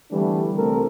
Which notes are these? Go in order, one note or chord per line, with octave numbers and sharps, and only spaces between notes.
D3 E3 G3 A3 B3 D4
C2 A3 C4 A4 A#4